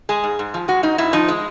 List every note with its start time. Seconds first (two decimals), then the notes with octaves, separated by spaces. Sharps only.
0.09 G#3 G#4
0.24 G#2
0.39 G#2
0.54 F3
0.68 G#3 F#4
0.83 G#2 D#4
0.98 G#2 E4
1.13 F3 D#4
1.28 G#3